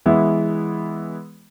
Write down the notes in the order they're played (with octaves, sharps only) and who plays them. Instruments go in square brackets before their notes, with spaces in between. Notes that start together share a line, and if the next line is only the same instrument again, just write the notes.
[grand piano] E3 G#3 B3 E4